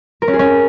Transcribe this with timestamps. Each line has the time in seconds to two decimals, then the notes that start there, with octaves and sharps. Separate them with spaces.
0.22 A#4
0.28 C#4
0.33 G#4
0.39 C#4